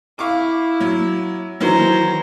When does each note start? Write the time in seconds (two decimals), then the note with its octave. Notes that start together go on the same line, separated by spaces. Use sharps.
0.19 E4 F5 C#6 D6
0.80 F#3
1.61 D#3 E3 F#3 C5 A#5